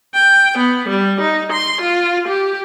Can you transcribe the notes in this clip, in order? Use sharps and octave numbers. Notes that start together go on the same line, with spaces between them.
G5
B3
G3
D#4
C6
F4
G4